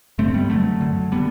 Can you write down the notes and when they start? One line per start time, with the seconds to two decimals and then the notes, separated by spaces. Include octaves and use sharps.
0.18 G2 D3 A3 C4
0.34 G3 B3
0.50 F#2 D3 F#3 A3
0.81 F#2 D3
1.12 D3 G3 B3